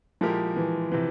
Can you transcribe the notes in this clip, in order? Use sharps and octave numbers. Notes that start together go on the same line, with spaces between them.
A#2 F3 G#3 E4 G4 A#4
E3
C3 E3